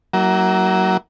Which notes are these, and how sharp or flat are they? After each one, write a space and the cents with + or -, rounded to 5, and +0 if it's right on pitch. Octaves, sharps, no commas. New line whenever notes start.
F#3 +25 A#3 +0 E4 -20